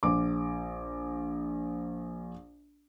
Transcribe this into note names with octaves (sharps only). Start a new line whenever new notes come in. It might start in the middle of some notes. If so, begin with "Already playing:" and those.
A#1 D6